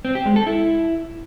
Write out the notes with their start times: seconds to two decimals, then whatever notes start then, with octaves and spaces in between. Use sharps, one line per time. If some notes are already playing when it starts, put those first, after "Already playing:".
0.05 C4
0.15 G4
0.26 G#3
0.36 A4
0.47 E4